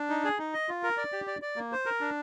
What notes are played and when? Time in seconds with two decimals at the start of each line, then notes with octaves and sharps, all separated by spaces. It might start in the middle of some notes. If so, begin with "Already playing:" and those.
Already playing: D4
0.09 D#4
0.24 G#4
0.38 D#4
0.54 D#5
0.69 F4
0.83 A#4
0.97 D5
1.12 G4
1.27 D5
1.42 D5
1.56 A#3
1.72 C5
1.86 A#4
2.00 D4